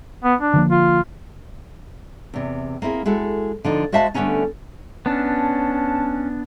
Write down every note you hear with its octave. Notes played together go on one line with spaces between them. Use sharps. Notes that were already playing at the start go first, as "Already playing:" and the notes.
B3
D4
D3 F3 A#3
F4
E2 C3
A#3 C4 E4 G#4
G#3 E4 F#4 A4
D3 F3 D#4
G#3 F#4 C5 E5 F5 A5
D3 G3 A3 B3 C#4 D#4
B3 C#4 D4 A5